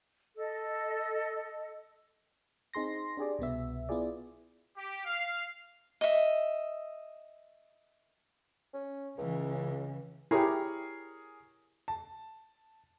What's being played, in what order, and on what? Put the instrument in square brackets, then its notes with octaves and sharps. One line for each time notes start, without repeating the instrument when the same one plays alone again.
[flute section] A4 D#5
[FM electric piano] C4 D#4 G#4 C6 A#6
D4 G4 G#4 D5
C2 B2 B3 E5
B3 E4 F4 G#4 D5
[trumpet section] G4
F5
[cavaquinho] D#5 E5
[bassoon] C#4
[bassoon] C#2 [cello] C#3 E3
[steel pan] E4 G4 [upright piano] G#4 A#4 C#5
[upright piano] A5